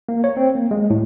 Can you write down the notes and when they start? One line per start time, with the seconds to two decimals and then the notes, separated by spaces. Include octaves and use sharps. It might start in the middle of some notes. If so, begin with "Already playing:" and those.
0.09 A#3
0.24 C#5
0.37 C4
0.55 A#3
0.71 G#3
0.90 A2